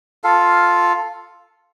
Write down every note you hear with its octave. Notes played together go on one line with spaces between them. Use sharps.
F4 A4 F5